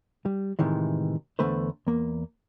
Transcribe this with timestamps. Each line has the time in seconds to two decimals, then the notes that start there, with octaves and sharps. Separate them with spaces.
0.25 G3
0.59 A2 C3 D#3 E3 G#3
1.39 E2 G#2 D3 A3 B4 C5
1.87 E2 A#3